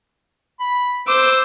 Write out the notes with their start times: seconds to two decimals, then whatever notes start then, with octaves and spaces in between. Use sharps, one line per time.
0.60 B5
1.08 C5 D6 E6